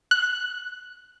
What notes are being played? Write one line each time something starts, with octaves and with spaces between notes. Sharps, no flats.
F#6